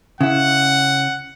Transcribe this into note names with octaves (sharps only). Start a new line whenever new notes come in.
C#3 E4 F#5